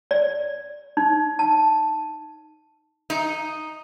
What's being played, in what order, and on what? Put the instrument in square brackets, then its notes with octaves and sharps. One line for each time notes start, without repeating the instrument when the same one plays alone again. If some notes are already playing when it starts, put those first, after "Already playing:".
[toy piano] D5
D#4
A5
[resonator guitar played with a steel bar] D#4